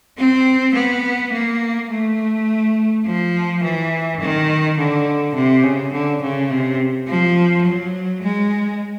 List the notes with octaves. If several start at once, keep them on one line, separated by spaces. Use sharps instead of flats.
C4
B3
A#3
A3
F3
E3
D#3
D3
C3
C#3
D3
C#3
C3
F3
F#3
G#3